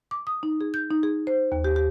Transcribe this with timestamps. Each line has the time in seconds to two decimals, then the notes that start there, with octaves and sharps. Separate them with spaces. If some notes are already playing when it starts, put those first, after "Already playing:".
0.11 D6
0.27 D#6
0.43 D#4
0.61 G#4
0.74 G6
0.91 D#4
1.03 G#4
1.27 C5
1.52 D#2
1.64 G4
1.76 G4